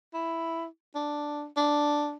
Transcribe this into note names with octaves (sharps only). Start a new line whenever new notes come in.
E4
D4
D4